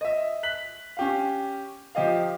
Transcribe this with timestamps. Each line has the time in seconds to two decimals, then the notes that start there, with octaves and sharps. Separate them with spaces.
0.01 D#5 E5
0.43 F#6 B6 F#7
0.97 C#4 G4 F5
1.95 F3 G4 D#5 F5